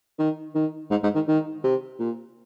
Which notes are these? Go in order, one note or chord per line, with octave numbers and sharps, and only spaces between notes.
D#3
D#3
G#2
G#2
D#3
D#3
C3
A#2